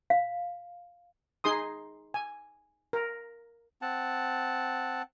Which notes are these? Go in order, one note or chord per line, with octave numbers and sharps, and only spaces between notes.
F5
D#4 G#4 C6 D#6
G#5
A#4
C4 F#5 A5